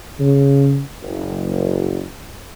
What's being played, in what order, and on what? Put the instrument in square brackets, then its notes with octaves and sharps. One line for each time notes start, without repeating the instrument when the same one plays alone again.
[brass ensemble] C#3
F#1